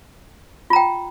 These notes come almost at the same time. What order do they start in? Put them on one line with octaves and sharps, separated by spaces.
F4 A#5 G5